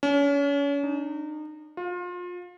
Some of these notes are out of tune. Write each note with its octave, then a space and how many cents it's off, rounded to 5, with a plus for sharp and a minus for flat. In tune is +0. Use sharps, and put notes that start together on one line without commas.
C#4 +35
D#4 -30
F4 +30